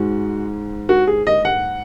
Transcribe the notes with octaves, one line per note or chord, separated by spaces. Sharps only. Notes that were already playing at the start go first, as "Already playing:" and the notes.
Already playing: G#2 G#3 F#4
F#4
G#4
D#5
F#5